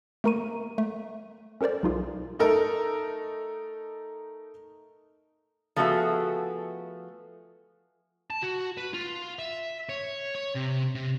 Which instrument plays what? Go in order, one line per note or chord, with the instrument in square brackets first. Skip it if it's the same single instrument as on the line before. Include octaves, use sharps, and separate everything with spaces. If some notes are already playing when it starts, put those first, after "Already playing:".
[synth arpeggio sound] A3 A#3 A#4 A#5 C#6 D#7
A3
C#4 A4 A#4 C5 D5
B1 D#4 F4 G#4
[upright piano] A3 D#4 A4 A#4
[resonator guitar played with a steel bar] F3 A3 B3 F#4 G#4 E5
[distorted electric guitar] A5
F#4
B4
F4
E5
C#5
C#5
C3
C3